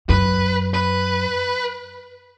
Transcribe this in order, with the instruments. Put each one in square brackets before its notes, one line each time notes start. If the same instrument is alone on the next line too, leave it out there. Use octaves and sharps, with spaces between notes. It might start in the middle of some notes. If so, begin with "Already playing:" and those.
[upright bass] F#2 [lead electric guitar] B4
[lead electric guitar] B4